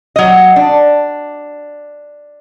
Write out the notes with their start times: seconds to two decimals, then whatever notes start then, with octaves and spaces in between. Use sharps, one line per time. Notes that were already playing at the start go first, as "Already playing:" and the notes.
0.16 F#3 D#5
0.56 D4